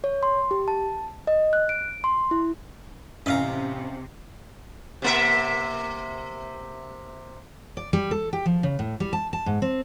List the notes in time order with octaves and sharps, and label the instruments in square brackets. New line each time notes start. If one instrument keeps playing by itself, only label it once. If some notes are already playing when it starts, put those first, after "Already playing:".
[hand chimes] C#5
C6
G4
A5
D#5
F#6
D7
C6
E4
[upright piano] A1 [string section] C3 [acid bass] C#4 [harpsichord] E5 F5 A#5
[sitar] C3 A#3 E5
[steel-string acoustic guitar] D5
G3
A4
G4
F3
C#3
A2
G3
A5
A5
G#2
C4